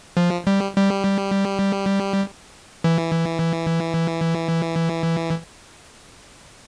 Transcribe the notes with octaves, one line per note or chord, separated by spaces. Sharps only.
F3
G3
G3
E3